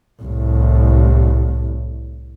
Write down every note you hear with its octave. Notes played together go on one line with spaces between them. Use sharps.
C2 A2